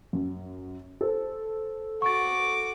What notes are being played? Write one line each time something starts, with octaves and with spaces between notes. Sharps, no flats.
F#2
A4 C5
F#4 C#6 D6 A6